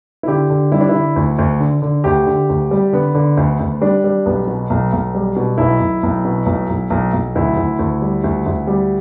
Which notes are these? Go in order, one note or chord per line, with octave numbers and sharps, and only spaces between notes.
E4
D3 G4
D3
G3 E4
D4
E4
D3
D2
D2
D3
D3
D2 G4
D3
D2
G3
D3 B3
D3
D2
D2
G3 D4
G3
B1 B3
B2
B1
B1
G3
B2
B1 E4
B1
B1
B2
B1
B1
B1
B1
D2 E4
D2
D2
G3
D2
D2
G3